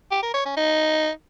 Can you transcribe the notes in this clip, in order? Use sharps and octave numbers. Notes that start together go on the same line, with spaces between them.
G4
A#4
C#5
C#4
D#4